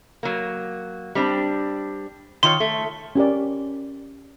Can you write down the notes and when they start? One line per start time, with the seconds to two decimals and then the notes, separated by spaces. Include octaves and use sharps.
0.23 F#3 A#3
1.15 G3 C4 D4
2.43 D#3 F4 C#5 C6
2.60 A3
3.15 C#4 G4 A#4 D5